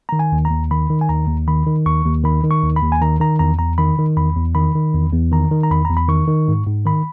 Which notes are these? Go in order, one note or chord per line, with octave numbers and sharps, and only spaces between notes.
D#3 A#5
G#5
D#2
A#5
D#2
D#3 B5
D#3
G#5
D#2 A#5
D#2
D#3 B5
D#3
D#2 C#6
D#2
D#3 B5
D#3
C#6
D#2
B5
D#2
G#5
D#3 A#5
D#3 A#5
E2 A#5
E2 A#5
D#3 B5
D#3
E2 B5
E2
D#3 B5
D#3
E2
E2
D#3 A#5
D#3
A#5
E2 B5
E2 A#5
B5
D#3 C#6
D#3
G#2
G#2
D#3 B5